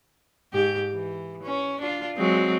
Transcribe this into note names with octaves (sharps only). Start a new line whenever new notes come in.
G#2 G4
E3
C#4
D4 F4
F#3 G#3 C4